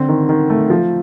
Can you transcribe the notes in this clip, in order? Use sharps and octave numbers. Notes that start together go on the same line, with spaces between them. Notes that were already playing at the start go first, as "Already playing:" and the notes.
Already playing: D3 C4
D#3
D#3
A3
F3